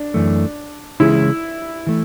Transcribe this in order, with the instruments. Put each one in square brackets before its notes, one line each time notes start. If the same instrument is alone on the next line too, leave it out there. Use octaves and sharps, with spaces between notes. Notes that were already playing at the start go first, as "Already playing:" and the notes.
Already playing: [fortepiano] D4
[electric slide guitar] F#2 E3 A3
[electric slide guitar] C#3 E3 G#3 C#4 G#4 [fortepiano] E4
[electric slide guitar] E3 A3